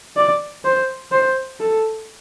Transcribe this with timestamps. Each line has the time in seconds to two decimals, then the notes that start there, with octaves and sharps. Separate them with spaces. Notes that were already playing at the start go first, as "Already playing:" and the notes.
0.16 D5
0.65 C5
1.12 C5
1.60 A4